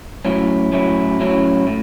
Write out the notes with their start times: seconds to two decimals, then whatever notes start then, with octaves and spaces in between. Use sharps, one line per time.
0.25 A2 F#3 C#4 E4
0.72 A2 F#3 C#4 E4
1.20 A2 F#3 C#4 E4
1.67 A2